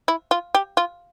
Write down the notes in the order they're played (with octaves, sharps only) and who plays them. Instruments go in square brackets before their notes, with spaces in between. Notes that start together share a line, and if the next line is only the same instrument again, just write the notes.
[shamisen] E4
F4
G4
F4